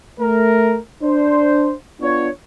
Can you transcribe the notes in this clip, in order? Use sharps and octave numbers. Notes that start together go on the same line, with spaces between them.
A3 A#4
D4 C5
B3 D4 F4 C#5